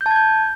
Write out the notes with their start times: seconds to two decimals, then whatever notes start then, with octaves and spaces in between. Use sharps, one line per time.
0.01 G6
0.06 A5
0.11 G#6
0.16 G6